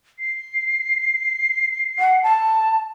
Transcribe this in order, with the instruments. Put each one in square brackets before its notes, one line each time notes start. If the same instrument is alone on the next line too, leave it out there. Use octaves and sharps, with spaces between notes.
[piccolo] C7
[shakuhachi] F#5
A5